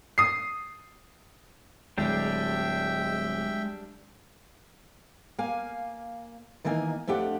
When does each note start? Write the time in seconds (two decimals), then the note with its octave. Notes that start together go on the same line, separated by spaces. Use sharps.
0.18 D#6 C7
1.98 D1 G3 G#3 D4 G4 E5 G5
5.39 A#3 F5 G#5
6.64 D#3 E3 A#3 D#5 G#5
7.07 F2 A3 D4 G4 F#5